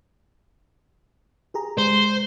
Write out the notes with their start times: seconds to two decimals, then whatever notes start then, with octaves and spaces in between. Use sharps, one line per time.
1.54 G4 G#4 A#5
1.78 G#3 C5